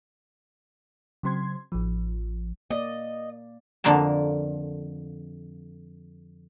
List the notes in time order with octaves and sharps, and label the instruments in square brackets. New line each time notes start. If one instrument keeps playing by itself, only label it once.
[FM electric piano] C#3 F#3 C4 C6 G#6
A1 F3
[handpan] A#3 D5 [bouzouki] D#5
[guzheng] F2 D3 A#3 A#4 A5